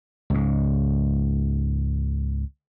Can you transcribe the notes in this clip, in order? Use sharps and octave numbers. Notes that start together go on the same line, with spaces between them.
C#2 G#2